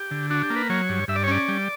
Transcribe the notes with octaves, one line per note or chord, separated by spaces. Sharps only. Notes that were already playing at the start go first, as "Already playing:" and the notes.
Already playing: G4
D3
D4 F#4
G4
A#3
B4
F#3 C#5
G2
G2 E5
D5
C#5
C#4 D5
G3